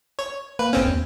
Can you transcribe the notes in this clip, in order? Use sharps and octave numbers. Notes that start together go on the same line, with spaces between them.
C#5
A#3 B4
G1 C4 C#4
D#2